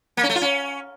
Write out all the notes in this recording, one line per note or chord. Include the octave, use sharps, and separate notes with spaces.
A#3
C#4
A3
F4
C#4